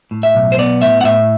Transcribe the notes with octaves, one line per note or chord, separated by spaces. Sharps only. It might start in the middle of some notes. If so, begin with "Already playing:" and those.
A2
E5
B1
C5
B3 D5
A2 E5
F#5
A2 E5